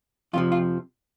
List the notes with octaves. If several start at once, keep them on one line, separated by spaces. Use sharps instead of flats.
F2 C3 F3 F4
F4